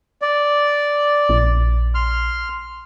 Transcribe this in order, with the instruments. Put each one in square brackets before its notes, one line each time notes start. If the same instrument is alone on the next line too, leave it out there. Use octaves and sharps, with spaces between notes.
[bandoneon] D5
[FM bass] A#1
[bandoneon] C6 F6